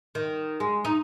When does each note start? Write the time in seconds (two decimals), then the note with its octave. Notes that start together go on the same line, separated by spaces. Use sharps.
0.15 D#3
0.60 G#3
0.85 D#4